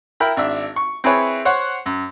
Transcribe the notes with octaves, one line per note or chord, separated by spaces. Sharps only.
E4 A#4 G5 B5
G#1 D4 E5
C#6
C4 E4 G#4 B4 C#5
C5 C#5 F#5
F#2